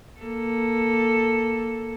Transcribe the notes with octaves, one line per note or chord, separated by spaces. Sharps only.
A#3 A4